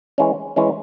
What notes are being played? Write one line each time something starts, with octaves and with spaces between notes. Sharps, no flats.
E3 G#3 C#4
E3 G#3 C#4